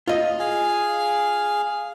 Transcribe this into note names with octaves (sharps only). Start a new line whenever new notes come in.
F4 D#5
G#4 F5 G#5